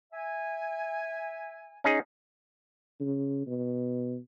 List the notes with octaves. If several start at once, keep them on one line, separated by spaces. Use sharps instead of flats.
E5 G#5
C#4 D#4 G#4
C#3
B2